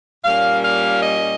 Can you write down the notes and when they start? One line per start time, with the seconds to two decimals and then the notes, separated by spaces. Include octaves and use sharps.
0.24 A#2 G3 A#3 C#4 F5
0.63 F5
1.01 D#5